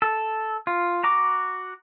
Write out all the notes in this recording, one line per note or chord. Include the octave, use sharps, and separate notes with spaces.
A4
F4
F#4 A#5 D6